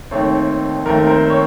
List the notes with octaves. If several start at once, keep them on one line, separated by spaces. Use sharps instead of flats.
D#2 D#3 A3 C4 C#5
D#2 D#3 A3 C4 A#4
A#4
C5
C#5